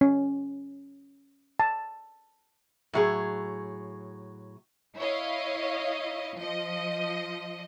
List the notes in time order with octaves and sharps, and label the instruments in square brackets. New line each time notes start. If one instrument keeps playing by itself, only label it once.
[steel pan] C#4
A5
[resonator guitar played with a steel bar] A2 F#3 G#4
[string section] E4 C#5 D#5 F5
F3 D#5